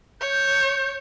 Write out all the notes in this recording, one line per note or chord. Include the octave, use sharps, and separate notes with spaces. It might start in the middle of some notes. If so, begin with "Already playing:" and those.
C#5 G6